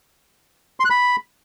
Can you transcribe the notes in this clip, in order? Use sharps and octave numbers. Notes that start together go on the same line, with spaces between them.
C6
F#6
B5